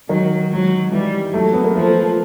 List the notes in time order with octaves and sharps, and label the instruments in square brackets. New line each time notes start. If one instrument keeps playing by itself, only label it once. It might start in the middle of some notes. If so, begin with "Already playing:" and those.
[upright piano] D#3 [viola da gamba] F#3
[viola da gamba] F#3
[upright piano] E3 [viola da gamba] G3
[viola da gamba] F#3 [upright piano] A3
[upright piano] B3
A#3
[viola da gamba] F3 [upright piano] A3